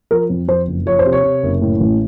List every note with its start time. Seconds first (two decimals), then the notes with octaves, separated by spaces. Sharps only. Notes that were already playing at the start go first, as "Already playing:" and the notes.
0.11 F3 A#4
0.30 F2
0.48 F2 C5
0.67 F#1
0.86 F3 C#5
0.99 C5
1.05 C3
1.13 C#5
1.24 C3
1.43 F#1
1.62 A2
1.80 A1